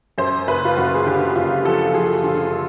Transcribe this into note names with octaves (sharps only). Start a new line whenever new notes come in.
F#2 C5
F#1 B4
F4
F#2 F#4
G#4
D3 G4
F#1 F4
F3 A4
A4
F3 G#4
D3 F4
A4